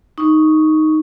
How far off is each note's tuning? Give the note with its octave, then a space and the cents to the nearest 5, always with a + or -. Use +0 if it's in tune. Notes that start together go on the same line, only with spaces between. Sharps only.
D#4 +0 C#6 +0